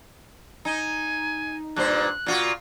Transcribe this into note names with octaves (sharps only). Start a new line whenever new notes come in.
D#4 G#5
G2 A#2 C5 F#6
A#2 F4 F#4